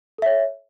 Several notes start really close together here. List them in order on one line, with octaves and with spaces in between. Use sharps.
A4 E5 C#5